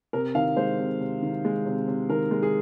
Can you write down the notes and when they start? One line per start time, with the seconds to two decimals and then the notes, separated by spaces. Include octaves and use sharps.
0.13 C3 A#4
0.35 D#3 F5
0.56 G#3 C5
0.79 C3
1.00 C3
1.22 D#3
1.45 G#3
1.66 C3
1.88 C3
2.09 D#3 A#4
2.31 G#3
2.43 G#4